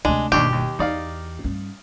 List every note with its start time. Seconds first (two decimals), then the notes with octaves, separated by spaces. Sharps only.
0.05 D2 C3 G#3 D4
0.32 G1 D#2 B2 D4 G4 C#6
0.53 D#2
0.79 E2 D#4 D5 F5
1.44 G2 C#4